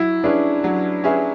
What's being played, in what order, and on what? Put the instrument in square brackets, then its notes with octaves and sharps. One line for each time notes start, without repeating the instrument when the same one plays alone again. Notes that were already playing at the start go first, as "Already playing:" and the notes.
Already playing: [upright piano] F#3 [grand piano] E4
[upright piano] C#4 G#4 B4 E5 [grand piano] D4
[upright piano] F#3
C#4 G#4 B4 E5